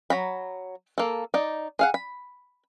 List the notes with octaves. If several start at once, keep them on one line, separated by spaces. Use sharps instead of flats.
F#3 A#5 B5
A#3 A4
D#4 D5
G#4 F5 F#5
B5